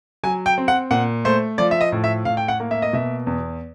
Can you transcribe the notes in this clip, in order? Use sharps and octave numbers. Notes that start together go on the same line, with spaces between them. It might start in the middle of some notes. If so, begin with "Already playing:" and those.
F#3 G#5
G5
C4
F#5
A#2 F#5
A3 C5
F3 D5
E5
D#5
A2
E5
A2 F5
G5
F#5
A#3
E5
D#5
B2 E5
E2